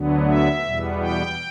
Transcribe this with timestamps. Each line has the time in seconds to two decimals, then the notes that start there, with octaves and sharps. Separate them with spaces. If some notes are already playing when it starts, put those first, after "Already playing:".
Already playing: D2 D3 F#3 B3
0.26 E5
0.63 E2 B2 G3 B3
1.00 G5